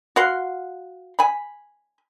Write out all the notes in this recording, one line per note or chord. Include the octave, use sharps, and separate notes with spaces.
F#4 F5 F#5 C6
G#5 B5